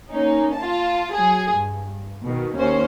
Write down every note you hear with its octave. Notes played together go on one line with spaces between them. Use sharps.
A#3 C#4 D#4
F4 A5
F#3 G#4
G2
B2 D#3
D#2 C#4 C5